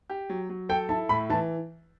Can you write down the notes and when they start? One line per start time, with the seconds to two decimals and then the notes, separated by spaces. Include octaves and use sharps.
0.10 G4
0.29 F#3
0.50 F#3
0.69 A4 G5
0.89 E4 A5
1.09 A2 B5
1.30 E3 A5